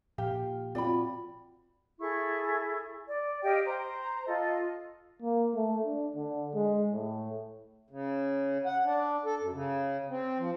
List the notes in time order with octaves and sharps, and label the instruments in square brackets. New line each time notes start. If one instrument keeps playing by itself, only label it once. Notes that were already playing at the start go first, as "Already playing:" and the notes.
[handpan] A#2 F3 F5 [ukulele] G4
[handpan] C4 F#4 [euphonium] F4 [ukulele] D5 G5 B5
[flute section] E4 G#4 A4 C#6
D5
G4 D#5 F5 G5
C5 A#5
F4 A4 D#5
[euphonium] A#3
A3
D4
D3
G#3
A2
[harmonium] C#3
F#5
D4
A4
F#2
C#3
C4
F3